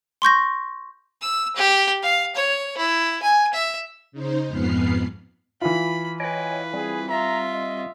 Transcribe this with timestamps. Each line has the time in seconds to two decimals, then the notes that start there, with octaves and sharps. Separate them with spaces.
0.22 C6 C#6 G6 A#6
1.21 E6
1.56 G4
2.03 F5
2.35 C#5
2.77 E4
3.22 G#5
3.53 E5
4.12 C#3 D#4 C5
4.48 F2 G#2 B3 B4 F6 C7
5.62 E3 F4 B5
6.20 B4 C#5 D#5 G5 G#5
6.74 G3 C4 G#4
7.10 F4 E5 A#5
7.52 D#5